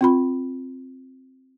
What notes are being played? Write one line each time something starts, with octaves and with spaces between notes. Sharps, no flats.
C4 F4 B5